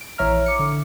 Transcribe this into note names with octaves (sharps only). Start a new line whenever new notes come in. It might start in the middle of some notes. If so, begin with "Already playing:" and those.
D7
A#1 E3 C#5 E5 A#5 F6
D6 C#7
D3